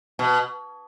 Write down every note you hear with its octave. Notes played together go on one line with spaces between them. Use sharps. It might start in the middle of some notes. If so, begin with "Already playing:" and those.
B2